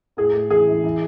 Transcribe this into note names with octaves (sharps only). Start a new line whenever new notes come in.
A2 G#4
A2
E3 G#4
E3
E3